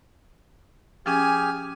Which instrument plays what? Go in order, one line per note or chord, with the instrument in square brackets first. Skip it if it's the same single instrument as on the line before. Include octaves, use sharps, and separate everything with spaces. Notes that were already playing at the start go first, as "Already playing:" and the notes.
[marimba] F3 C#4 G5 [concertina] G4 G#4 F6 [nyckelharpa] G#5